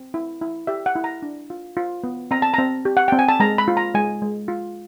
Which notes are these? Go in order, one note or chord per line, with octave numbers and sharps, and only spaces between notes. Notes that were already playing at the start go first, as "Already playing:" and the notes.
Already playing: C4
E4
E4
G4 E5
F#5
E4
A#5
D4
F4
F4
B3
C4 A#5
A5
C4 A#5
G4
F#5
C4 G5
G#5
A5
G#3 A#5
B5
F4
A#5
G#3 G#5
G#3
F4